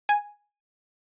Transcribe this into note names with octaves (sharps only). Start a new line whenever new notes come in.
G#5